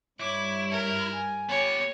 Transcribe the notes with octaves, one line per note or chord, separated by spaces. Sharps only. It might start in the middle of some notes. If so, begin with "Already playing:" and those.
G2 G3 E4 C#5 D6
A#4
G#5
B3 G4 C#5